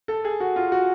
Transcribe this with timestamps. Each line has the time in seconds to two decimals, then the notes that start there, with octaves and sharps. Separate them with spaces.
0.08 A4
0.25 G#4
0.40 F#4
0.56 F4
0.72 F#4